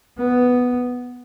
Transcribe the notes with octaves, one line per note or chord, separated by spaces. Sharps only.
B3